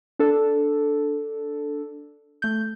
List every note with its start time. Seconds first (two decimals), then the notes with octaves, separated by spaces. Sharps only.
0.19 D4 A4
2.42 A3 G6